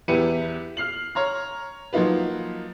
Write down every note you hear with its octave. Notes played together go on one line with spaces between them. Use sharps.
E2 E4 G4 B4 C#7 D#7
F6 C7 F#7
C#5 A#5 F6
F3 F#3 A#3 D#4 F4 B4